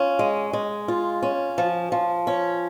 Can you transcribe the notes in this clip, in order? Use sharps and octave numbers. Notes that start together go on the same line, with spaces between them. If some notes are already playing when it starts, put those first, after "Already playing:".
Already playing: C#4 F4
G#3
G#3
F4
C#4
F3
F3
C#4